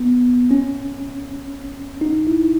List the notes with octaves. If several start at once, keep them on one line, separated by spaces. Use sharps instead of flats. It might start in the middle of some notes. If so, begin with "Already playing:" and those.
Already playing: B3
C#4
D#4
E4